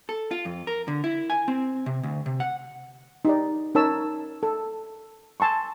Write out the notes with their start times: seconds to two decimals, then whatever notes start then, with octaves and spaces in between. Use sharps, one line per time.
0.09 A4
0.31 F4
0.45 F2
0.67 A#4
0.88 D3
1.04 E4
1.30 G#5
1.48 C4
1.86 C3
2.03 D2
2.26 C3
2.40 F#5
3.25 D#4 G4 D5
3.75 C#4 D#4 A#4 C#5 A5 E6
4.43 A4
5.40 G#5 A5 C6 C#6